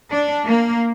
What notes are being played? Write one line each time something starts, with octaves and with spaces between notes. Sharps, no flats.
D4
A#3